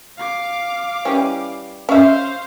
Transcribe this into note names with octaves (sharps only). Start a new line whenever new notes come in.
F5 D6
E3 G3 C#4
C#4 C5 E5 F5